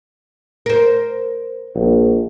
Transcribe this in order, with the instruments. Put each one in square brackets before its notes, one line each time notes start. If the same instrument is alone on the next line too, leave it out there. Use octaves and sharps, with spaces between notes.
[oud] A#4 C5
[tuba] A#1